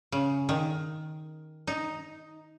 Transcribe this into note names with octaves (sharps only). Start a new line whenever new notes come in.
C#3
D#3
D#4